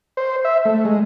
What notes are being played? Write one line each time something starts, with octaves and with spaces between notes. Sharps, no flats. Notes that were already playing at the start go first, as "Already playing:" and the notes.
C5
E5
A3
G#3